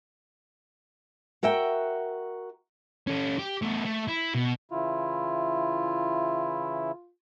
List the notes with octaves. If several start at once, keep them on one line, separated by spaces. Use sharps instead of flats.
F#4 A#4 E5 F#5 G5
C#4 A4
G4
A3 B3
A3
E4
B2
C#3 E3 E4 F4